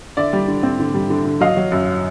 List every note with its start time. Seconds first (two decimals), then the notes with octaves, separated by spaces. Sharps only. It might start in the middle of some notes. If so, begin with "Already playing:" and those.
0.17 D3 D5 E5
0.33 G3
0.48 D3
0.63 C4
0.79 D3
0.94 G3
1.10 D3
1.25 D3
1.41 F#3 D#5 F5
1.57 F#3
1.72 F#2